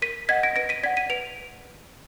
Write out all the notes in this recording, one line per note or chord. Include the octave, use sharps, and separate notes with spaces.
A#4 B6 D#7
D#5 F#5 G#6 B6
A#6 D7
B4 A#6 D7
B6 D#7
D5 F#5 G#6 B6
B6 D#7
B4 D7 F7